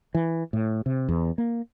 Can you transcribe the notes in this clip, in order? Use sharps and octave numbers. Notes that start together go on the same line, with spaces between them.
E3
A2
C3
E2
A#3